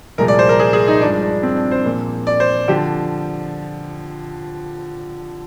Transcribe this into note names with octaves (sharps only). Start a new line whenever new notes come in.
C2 A#2 F3 G#3 A#4
D5
C5
A#4
G#4
G#4
D#4
G2 F3 G#3 D4
D4
C4
D4
C5
A#2 F3 A#3
D5
C5
D3 F3 G4